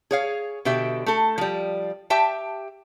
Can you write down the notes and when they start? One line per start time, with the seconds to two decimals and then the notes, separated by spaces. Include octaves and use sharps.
0.11 G#4 C#5 F5
0.65 B2 D3 G4 E5
1.06 A3 A4
1.38 F3 G3
2.10 G4 E5 G5 A5